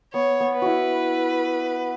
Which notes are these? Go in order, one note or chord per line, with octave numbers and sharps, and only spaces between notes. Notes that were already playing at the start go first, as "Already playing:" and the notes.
B3 C#5
B3
B4
E4 F#4